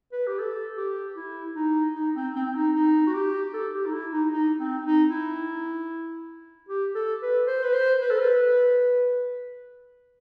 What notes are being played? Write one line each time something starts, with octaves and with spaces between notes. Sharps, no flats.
B4
G4
A4
G4
E4
D#4
D#4
C4
C4
C4
D#4
D#4
F#4
G4
A4
G4
D#4
E4
D#4
D#4
C4
D#4
E4
G4
A4
B4
C5
B4
C5
B4
A4
B4